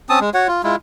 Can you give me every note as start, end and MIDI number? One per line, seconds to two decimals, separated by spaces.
0.09 0.19 60
0.09 0.19 61
0.09 0.19 81
0.09 0.19 87
0.21 0.30 56
0.34 0.47 66
0.34 0.47 73
0.34 0.47 78
0.47 0.63 65
0.63 0.76 56
0.63 0.76 64
0.63 0.76 65